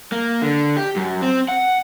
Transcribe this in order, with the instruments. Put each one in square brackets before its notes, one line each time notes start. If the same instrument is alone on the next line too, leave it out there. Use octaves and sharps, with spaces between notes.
[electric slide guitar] A#3
D3
G4
F#2
C4
F#5